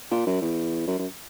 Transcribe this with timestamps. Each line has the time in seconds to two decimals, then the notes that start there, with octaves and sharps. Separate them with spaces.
0.11 A#2
0.27 F#2
0.42 E2
0.87 F#2
0.99 F#2